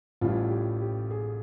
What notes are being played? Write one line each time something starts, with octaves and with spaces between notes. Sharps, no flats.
A1 A2 E3 G3 F4
G4
G4
G#4